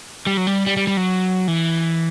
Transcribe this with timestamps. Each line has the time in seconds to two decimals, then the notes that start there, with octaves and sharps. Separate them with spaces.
0.27 G3
0.37 F#3
0.47 G3
0.66 G3
0.77 G3
0.87 G3
0.97 F#3
1.48 E3